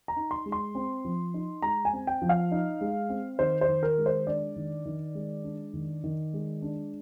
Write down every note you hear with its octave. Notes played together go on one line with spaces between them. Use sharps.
A#5
D#4
C6
G#3
C6
C4
F3
D#4
G#3 A#5
G#5
C4
G5
F3
F5
D#4
G#3
C4
D#3 C5
C5
D#3
A#4
G#3
C5
D4 D5
D#3
D#3
G#3
D4
D#3
D#3
G#3
D4